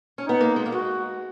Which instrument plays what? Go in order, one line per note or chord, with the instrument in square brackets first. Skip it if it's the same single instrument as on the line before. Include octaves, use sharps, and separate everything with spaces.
[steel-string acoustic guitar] C#4
[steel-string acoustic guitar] B3 [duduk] D#4
[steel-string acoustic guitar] A#3
G#3
A#3
[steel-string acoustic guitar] G#3 [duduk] F#4